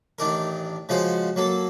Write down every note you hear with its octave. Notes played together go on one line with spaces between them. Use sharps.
A1 D#3 D4 A#4
C#3 F3 G#3 F#4 C5
F#3 A#3 A4